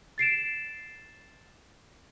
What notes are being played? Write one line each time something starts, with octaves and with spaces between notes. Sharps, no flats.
A6 C7 D7 E7